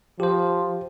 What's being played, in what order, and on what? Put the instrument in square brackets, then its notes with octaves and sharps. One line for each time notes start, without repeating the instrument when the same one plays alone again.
[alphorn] F3 [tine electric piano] G4 C5